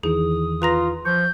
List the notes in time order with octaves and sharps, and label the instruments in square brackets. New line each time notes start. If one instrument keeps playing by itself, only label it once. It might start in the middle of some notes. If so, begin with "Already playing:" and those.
[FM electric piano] E2 D#3 E3 [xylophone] G#4 [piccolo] D#6
[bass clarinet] F4 [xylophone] B4 A#5 A#6
[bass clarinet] F3 [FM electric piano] C#6 [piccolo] G6